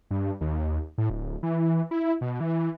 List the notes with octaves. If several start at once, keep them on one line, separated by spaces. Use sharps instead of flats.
G2
D#2
A2
D1
E3
E4
B2
E3